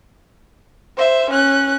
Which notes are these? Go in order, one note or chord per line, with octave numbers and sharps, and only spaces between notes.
C5 E5
C#4 F#6